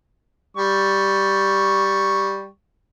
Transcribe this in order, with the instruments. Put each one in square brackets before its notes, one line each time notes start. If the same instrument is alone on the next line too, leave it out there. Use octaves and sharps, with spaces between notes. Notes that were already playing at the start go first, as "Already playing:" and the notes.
[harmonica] G3 C#6